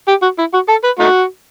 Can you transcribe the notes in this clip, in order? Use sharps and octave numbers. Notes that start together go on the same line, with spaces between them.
G4
F#4
E4
F#4
A4
B4
A3 D#4 F#4